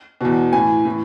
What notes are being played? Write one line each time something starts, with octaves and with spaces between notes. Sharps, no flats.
E2 B2
A2 E3 G#5
A2 E3